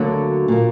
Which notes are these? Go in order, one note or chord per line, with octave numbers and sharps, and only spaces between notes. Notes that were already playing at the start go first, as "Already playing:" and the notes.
Already playing: D2 D3 F#3 A#3 F#4
A#2 A#3